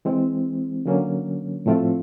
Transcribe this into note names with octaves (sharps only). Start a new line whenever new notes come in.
E3 G#3 C4
D3 F#3 A#3 C#4
A2 F3 A3 C4 F4